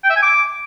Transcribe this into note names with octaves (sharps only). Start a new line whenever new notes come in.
G5
E5
G#5
D6